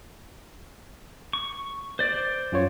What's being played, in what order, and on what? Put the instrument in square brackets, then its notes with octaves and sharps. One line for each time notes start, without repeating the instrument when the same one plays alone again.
[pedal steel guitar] C#6
C5 D5
[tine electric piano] F#2 F4 C#5